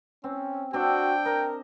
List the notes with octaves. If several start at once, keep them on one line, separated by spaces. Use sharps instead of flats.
C4 C#4
C4 D4 F#4 G5
A#4 D#5